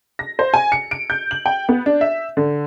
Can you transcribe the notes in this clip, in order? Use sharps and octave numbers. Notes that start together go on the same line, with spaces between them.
A#6
C5
G#5
C#7
D7
G6
F#7
G5
B3
D4
E5
D3